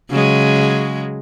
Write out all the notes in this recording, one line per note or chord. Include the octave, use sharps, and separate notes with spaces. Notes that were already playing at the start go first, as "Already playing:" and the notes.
C#3 F#3 G#3